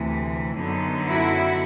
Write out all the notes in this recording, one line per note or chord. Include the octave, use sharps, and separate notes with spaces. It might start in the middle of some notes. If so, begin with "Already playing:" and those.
Already playing: D2 C3 E3
F#2 D3 F#3 B3 D#4
E4 F#4